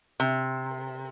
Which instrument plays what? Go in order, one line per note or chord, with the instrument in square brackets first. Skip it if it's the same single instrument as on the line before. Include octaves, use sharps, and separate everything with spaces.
[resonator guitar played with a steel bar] C3